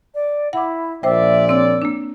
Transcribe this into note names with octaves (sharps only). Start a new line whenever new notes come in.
D5
E4 F#5 D6
A#1 A#2 C5 D5 E5 G5
C4 C#5 E6
A#3 D4